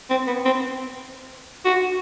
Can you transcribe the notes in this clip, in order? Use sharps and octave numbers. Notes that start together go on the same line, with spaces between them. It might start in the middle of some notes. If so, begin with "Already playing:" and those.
C4
B3
C4
F#4